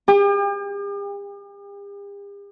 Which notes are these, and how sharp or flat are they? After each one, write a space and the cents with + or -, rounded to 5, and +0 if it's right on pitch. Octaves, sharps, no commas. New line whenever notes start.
G4 +45 G5 +35